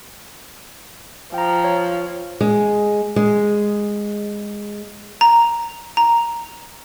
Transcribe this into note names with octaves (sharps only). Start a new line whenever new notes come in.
F3 G5 A#5
C#5
G#3
G#3
A#5
A#5